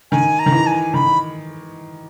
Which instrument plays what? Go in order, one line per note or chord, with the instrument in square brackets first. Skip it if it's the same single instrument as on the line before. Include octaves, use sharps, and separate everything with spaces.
[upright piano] D#3 [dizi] G#5
[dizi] A#5
[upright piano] D#3
E3
[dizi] G#5
[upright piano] D#3 [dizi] B5